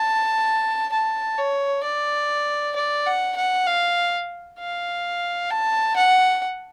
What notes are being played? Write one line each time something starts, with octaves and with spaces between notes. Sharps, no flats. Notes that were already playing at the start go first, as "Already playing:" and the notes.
Already playing: A5
A5
C#5
D5
D5
F#5
F#5
F5
F5
A5
F#5